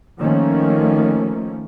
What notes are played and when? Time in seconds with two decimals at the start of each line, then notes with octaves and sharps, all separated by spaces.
0.18 D#3 F3 A3 A#3 C#4